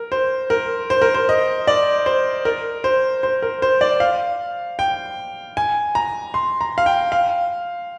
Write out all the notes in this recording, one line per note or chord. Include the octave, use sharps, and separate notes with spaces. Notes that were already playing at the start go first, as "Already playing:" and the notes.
Already playing: A#4
C5
A#4
C5
A#4
C5
D#5
D5
C5
A#4
C5
C5
A#4
C5
D5
F5
G5
G#5
A#5
C6
A#5
F5
G5
F5